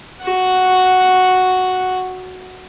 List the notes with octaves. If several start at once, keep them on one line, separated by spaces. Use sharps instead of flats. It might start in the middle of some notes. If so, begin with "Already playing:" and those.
F#4 F#5